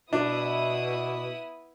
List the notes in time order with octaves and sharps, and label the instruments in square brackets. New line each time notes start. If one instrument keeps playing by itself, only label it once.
[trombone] B2 [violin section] B3 E4 D#6 [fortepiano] D4